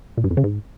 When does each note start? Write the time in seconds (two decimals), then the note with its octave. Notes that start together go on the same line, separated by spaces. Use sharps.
0.17 A#2
0.24 G2
0.31 F2
0.37 C#3
0.44 G#2